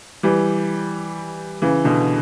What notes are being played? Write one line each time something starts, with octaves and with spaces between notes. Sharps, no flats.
E3 G3
C#3 E3
B2 D3